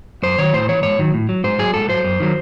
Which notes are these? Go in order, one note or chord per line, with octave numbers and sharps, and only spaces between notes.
F#2 C5
D#3 F#3 C#5
A2 C5
E3 C#5
G#2 C#5
D#3 F#3
A2
F#3
G#2 C5
F#3 G#4
G#2 A4
F#3 C5
F#2
D#3 F#3